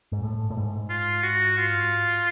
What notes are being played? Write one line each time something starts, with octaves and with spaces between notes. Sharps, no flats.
G#2
A2
A2
G#2
F4
F#4
F4